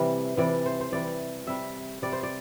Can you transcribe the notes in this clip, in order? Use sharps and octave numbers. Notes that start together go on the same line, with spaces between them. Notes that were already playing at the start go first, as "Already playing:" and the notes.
Already playing: C3 E3 G3
C3 E3 G3 D5
C5
C5
C3 E3 G3 D5
C3 G3 E5
C3 G3 D5
C5
D5